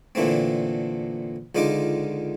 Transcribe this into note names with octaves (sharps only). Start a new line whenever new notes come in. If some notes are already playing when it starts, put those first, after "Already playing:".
A#2 D3 E3 A3 A#3 C4
C#2 D3 D#4 F4 D#5 D6